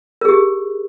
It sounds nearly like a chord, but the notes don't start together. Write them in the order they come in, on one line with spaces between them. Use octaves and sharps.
A#4 G#4 G4